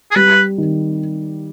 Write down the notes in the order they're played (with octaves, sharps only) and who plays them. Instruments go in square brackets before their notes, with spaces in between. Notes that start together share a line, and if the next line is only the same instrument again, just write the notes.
[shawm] G#4
[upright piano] G3 [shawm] B4
[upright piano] D#3